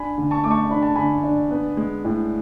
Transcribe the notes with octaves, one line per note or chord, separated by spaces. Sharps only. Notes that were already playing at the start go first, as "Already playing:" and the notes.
Already playing: D4 G#5 B5
D3
A5 C#6
A3 D6
A5 C#6
D4 B5
A5
D3 G#5 B5
D4
B3
G#3
A2